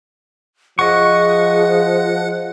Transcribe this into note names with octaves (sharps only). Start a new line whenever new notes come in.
F3 G#4 D#5 F#5 C#6